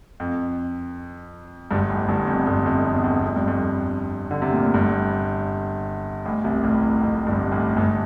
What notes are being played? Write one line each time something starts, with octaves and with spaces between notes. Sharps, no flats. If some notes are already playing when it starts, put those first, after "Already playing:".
F2
G1 G2
A1 A2
G1 G2
F2
G1 G2
F2
E2
F2
F2
G2
F2
D3
C3
A#2
A2
G1 G2
A1 A2
C2 C3
A1 A2
F2
G1 G2
A1 A2
G1 G2